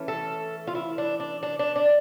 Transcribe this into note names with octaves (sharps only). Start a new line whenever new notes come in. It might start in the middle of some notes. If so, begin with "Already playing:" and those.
Already playing: E3 A3 C#4
A4
F4
E4
D4
D4
D4
D4
D4